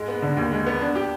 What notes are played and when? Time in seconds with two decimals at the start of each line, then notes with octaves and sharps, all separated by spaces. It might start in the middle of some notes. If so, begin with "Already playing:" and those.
Already playing: G#2 G#3
0.08 B3
0.22 D3
0.37 D#2
0.52 G#3
0.67 B3
0.81 D4
0.95 G4